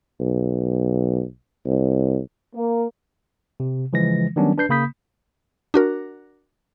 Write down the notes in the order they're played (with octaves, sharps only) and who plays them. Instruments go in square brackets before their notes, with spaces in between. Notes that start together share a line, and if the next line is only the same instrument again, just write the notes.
[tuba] B1
C2
[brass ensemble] A#3
[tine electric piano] C3
C#3 E3 F3 G#3 A#6
D#3 F#3 G3 B3 C#4 D4
D4 B4 G6 C7
C#3 A#3 B5 D#6 G6 B6
[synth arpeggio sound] D4 F#4 A#4